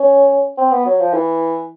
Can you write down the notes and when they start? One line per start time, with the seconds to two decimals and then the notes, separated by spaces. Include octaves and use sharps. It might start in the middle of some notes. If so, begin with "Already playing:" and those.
Already playing: C#4
0.57 C4
0.71 B3
0.86 F#3
1.00 F3
1.14 E3